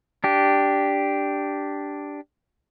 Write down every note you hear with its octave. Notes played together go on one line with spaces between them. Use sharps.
D4 G4